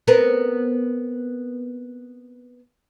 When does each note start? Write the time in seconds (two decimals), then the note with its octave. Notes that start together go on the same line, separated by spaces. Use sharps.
0.07 B3 C4 A#4